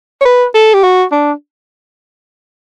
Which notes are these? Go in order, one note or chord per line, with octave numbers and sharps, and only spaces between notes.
C#5
B4
A4
G4
F#4
D4